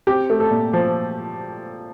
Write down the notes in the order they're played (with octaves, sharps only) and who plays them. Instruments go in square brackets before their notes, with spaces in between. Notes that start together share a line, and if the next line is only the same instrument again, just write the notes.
[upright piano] C4 G4
A3
A4
A#2
F3